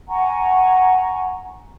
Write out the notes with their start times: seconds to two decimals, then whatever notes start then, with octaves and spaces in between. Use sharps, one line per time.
0.09 F#5 G#5 A#5 C#6